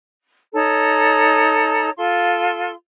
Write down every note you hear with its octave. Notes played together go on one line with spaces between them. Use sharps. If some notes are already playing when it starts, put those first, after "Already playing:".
D#4 A4 C#5 A#5
F4 A4 C6